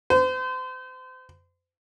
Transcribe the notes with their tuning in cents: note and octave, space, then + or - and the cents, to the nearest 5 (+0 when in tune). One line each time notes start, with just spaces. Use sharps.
C5 -35